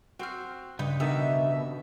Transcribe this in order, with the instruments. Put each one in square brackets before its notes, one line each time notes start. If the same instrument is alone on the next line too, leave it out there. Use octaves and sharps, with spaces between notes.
[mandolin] C4 F6 [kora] F#4 C5
[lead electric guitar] G2 [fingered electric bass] C#3 [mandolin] D#4 B4
[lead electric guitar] B2 [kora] D3 D#3 D#4 [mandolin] E5